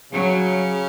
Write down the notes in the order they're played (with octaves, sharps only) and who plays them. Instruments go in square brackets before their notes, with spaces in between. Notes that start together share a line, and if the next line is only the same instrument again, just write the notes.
[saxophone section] C#3 [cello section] F#3